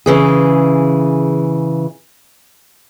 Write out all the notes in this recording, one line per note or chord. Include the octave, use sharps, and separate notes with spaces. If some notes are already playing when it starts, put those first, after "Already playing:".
C#3 E3 G#4